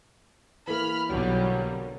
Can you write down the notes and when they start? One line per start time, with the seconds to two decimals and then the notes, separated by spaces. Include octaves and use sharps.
0.67 E3 A#3 B5 F6
1.10 B1 D3 F#3 G3